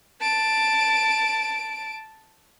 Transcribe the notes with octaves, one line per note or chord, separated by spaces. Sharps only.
A5 D7